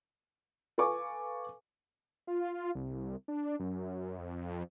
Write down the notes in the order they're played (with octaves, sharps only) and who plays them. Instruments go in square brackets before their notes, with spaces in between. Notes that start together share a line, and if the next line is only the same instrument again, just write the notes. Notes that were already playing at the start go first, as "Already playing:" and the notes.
[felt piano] A4 B4 F5 G#5 C#6 D6
[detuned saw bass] F4
C2
D4
F#2
F2